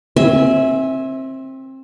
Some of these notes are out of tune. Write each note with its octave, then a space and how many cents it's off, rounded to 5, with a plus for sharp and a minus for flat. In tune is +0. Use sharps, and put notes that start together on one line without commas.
C4 +25 E5 -15 G#5 +0